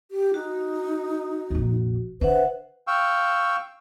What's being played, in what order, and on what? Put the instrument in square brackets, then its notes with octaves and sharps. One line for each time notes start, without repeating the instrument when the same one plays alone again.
[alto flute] G4
[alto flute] D#4 [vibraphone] F#4
[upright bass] F1 A#1
[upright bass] D3 [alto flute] B4 [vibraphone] C5 E5 F#5
[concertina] F5 G5 C#6 E6